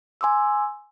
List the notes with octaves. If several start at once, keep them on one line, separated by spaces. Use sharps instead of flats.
G#5 C6 D6 E6